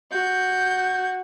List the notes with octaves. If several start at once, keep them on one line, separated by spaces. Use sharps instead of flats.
F#4 G6